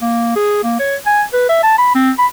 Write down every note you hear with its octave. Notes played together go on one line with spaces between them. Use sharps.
A#3
G#4
A#3
C#5
G#5
B4
E5
A5
B5
C4
B5